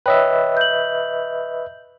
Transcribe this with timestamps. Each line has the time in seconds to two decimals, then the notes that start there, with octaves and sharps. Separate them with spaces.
0.06 B4 C#5 D#5 E5 G5
0.57 G6 F#7